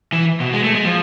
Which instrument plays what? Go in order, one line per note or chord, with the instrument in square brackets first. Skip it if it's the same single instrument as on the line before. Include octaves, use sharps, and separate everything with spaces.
[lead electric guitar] E3
B2
G#3
A3
G#3
F3